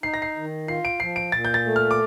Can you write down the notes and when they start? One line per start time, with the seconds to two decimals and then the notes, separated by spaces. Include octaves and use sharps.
0.03 D#4 C7
0.14 A#6
0.22 C7
0.37 D#3
0.68 F4 C7
0.85 D7
1.00 F3 C7
1.16 D7
1.32 A#2 A6
1.45 G6
1.54 A6
1.65 A3
1.76 F6
1.91 D6